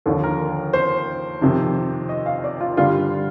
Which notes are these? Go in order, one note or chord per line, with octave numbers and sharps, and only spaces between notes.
D#2 D3 F3 A4
A#4
C5
F2 C3 D#3
D#5
F5
D5
F4
G2 D3 G3 F4